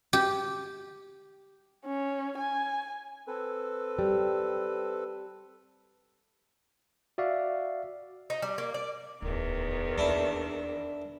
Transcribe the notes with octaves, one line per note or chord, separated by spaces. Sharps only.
G4
C#4
G#5
C4 A4 B4
G3
F#4 D5 E5 F5
D#4
G3
A#3
D5
D1 E2 D#3
D#2 D4 E4